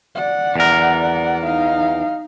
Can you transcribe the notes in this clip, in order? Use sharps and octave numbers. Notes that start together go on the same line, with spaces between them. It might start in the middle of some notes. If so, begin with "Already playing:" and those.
D5 F#5
E2 A#4
D#4 F5